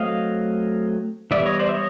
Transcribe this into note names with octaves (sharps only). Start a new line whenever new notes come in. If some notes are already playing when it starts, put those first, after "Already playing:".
Already playing: F#3 A3 C4 D#5 F5
E3 G3 B3 D5 E5
C#5 D#5
C5 D5
E5
C#5 D#5